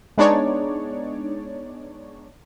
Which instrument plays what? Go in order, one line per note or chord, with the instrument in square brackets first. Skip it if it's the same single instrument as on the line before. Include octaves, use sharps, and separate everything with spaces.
[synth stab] G#3 B3 D4 D#4 C#5 D5